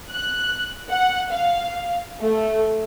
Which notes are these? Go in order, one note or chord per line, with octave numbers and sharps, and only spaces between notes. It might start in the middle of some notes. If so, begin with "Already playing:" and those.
F#6
F#5
F5
A3